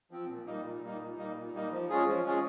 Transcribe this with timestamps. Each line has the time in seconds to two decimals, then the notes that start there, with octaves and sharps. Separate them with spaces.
0.11 F3 C4
0.29 A#2
0.46 G3 A#3 D#4
0.64 A#2
0.83 G3 A#3 D#4
1.00 A#2
1.18 G3 A#3 D#4
1.36 A#2
1.54 G3 A#3 D#4
1.71 F3
1.89 G#3 C#4 F4 G#4
2.07 F3
2.25 G#3 C#4 F4 G#4